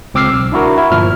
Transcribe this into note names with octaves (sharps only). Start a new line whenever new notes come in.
C#2 C4 D6 E6 F6 C7
B1
D4 E4 F#4 A#4
E4
G1 A#2 F3 F6